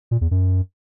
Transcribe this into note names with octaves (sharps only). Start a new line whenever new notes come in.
A#2
E2
F#2